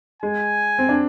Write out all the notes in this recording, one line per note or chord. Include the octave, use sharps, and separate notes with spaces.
G#3 G#5
C4
D4